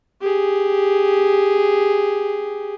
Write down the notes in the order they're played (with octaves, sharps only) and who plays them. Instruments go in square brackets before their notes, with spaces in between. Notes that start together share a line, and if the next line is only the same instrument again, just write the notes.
[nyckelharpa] G4 G#4